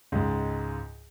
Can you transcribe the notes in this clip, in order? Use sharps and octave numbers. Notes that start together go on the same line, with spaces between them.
C#2 G#2